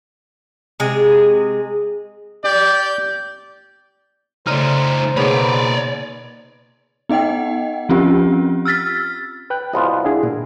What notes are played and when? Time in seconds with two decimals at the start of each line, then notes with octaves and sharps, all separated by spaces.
0.80 C3 G#3 G#4
2.45 G4 D5 G6
4.47 C#3 A3 D#4 C5 D5 A#5
5.17 B2 A#3 D#4 G#4 B4 C#5 D5
7.09 B3 D#4 D#5 F#5 G5
7.89 F3 C4 C#4 F4 G4
8.65 E6 F6 A6 B6
9.50 B4 G5 F#6
9.74 C2 B3 F4 F#4 D#5
10.05 D4 E4 G#4
10.23 A#2 A#4